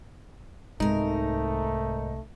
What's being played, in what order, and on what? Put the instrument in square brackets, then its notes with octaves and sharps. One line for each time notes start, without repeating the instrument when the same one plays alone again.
[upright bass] C2 C3 [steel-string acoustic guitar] G#2 A#4 [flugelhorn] A3 [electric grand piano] D#4